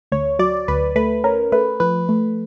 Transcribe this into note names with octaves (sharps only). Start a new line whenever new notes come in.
D2 C#5
F#3 D5
D2 B4
A3 B4
C#4 A#4
A3 B4
F3 B4
A3